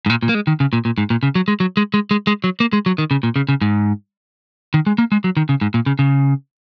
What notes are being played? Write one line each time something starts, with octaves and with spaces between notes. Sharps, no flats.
G#2
A#2
A#2
A#3
G#3
D#3
C#3
A#2
A#2
G#2
A#2
C#3
F#3
G#3
F#3
G#3
G#3
G#3
G#3
F#3
A#3
G#3
F#3
D#3
C#3
A#2
C#3
C#3
G#2
D#3
G#3
A#3
G#3
F#3
D#3
C#3
G#2
A#2
C#3
C#3